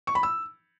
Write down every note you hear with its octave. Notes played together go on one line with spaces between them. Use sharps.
C#6
B5
E6